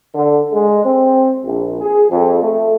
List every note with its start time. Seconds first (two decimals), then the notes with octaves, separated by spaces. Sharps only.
0.15 D3
0.52 G#3
0.84 C4
1.45 A#1
1.81 G#4
2.10 F2
2.43 A3